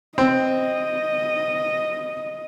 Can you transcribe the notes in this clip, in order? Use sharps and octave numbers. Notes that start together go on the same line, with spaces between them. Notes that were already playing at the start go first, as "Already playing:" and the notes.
C4 D#5